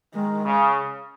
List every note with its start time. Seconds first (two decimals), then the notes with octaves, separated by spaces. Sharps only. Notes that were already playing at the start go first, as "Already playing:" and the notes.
0.14 D#3 G#3
0.45 C#3